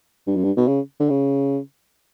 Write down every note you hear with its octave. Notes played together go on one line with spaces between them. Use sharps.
G2
F#2
G2
B2
C#3
D3
C#3